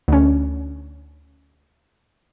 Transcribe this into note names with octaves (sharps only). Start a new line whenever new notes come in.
D2 C#4